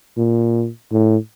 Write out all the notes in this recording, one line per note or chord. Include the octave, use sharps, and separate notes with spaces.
A#2
A2